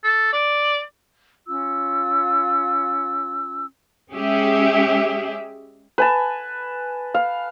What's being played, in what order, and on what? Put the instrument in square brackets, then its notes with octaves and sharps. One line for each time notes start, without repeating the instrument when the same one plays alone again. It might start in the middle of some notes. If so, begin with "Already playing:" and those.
[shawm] A4
D5
[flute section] C#4 F4 E6
[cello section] G#3 C#4 G4 G#4 E5
[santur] B4 G#5 A5
F5